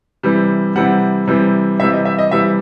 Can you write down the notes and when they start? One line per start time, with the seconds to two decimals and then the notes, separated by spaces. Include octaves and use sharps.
0.23 C3 E3 G3
0.76 C3 E3 G3 F#5
1.28 C3 E3 G3
1.80 C3 E3 G3 E5
1.93 D#5
2.05 E5
2.19 D#5
2.31 C3 E3 G3 E5